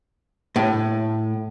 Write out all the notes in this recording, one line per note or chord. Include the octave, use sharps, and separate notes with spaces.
A2